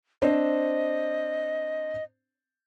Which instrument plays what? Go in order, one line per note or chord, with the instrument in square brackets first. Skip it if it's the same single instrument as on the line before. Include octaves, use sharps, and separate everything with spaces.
[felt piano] C4 D4 C5 [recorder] D#5